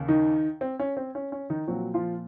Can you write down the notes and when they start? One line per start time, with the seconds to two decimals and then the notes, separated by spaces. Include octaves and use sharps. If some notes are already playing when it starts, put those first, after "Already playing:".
Already playing: D#2 C#3
0.08 D#3 D#4
0.61 C4
0.79 C#4
0.97 C4
1.15 C#4
1.32 C#4
1.50 D#3 D#4
1.67 A#2 F3 F#3 C4 F#4
1.94 F3 F4